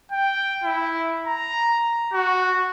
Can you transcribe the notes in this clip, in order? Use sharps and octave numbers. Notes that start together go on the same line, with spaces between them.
G5
E4
A#5
F#4